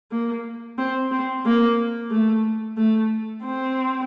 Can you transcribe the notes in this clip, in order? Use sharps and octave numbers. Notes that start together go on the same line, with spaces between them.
A#3
C4
C4
A#3
A3
A3
C4